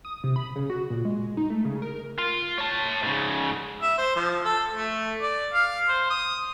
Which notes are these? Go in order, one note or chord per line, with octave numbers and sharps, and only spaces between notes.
D#6
C3
B5
C#3
F#4
A#2
G#3
D#4
A3
C#3
A#4
F4
C#5 A5
G#2 C#3
E5
C5
F3
A4
A3
D5
F5
C5
D#6